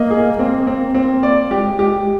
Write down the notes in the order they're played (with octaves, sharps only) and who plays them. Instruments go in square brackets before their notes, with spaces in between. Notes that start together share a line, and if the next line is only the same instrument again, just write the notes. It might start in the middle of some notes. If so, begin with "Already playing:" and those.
Already playing: [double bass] A#3 [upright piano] D#5
[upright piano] G#4
[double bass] A#3 [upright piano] C4
[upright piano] C4
[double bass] A#3 [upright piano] C4
[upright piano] D5
[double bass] G#3 [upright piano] G4
[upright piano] G4